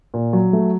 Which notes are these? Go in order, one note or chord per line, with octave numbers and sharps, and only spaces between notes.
A#2
F#3
A3